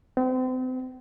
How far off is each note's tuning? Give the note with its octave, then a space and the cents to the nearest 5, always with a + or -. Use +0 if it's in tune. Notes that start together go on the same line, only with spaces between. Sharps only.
C4 -35